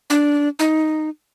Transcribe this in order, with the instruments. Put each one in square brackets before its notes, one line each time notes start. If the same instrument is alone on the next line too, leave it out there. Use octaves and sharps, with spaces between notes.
[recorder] D4
D#4